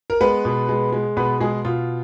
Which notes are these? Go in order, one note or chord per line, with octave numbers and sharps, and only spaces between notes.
A#4
G#3 B3 B4
B2
G#3
G#3
B2 B3 B4
B2 G#3 G#4
B2 F4